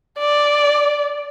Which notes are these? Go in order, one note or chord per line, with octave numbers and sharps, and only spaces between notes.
D5